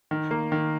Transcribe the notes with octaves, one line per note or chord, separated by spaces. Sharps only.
D#3
A#3
D#3